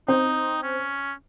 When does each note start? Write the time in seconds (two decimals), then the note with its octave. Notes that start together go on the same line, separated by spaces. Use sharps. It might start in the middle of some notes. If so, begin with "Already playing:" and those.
0.08 C4 D#4
0.63 C#4